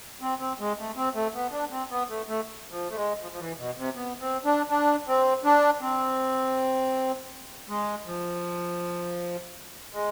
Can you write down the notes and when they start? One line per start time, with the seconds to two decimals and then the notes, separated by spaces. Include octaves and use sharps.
0.21 C4
0.40 C4
0.60 G#3
0.78 A3
0.96 C4
1.15 A3
1.34 B3
1.52 D4
1.71 C4
1.90 B3
2.09 A3
2.28 A3
2.71 F3
2.90 A3
2.96 G#3
3.21 F3
3.32 F3
3.40 E3
3.58 B2
3.77 C3
3.96 B3
4.21 C4
4.45 D4
4.70 D4
5.08 C4
5.44 D4
5.81 C4
7.69 G#3
8.06 F3
9.93 G#3